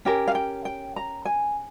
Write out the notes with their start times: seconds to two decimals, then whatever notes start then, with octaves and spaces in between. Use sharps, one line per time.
0.05 C#4 G4 A#4
0.28 F5
0.35 G5
0.65 G5
0.96 A#5
1.25 G#5